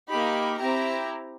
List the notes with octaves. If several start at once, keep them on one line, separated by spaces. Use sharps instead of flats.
A#3 D#4 G4 B5
C4 E4 G4 A#5